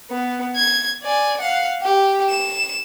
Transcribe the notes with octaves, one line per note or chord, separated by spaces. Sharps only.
B3
G#6
D5 G#5
F5 F#5
G4
E7